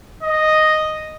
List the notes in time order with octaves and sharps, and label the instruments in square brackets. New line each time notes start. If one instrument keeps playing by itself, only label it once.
[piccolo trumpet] D#5